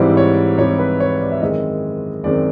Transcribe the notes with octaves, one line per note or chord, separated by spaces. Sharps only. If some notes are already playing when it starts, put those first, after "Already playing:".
Already playing: G#2 E3 G3 C4 E4 D5
C#5
G#2 E3 G3 C4 E4 C#5
B4
C#5
D5
E5
F#2 D#3 G#3 C4 D#5
F#2 D#3 G#3 C4 D5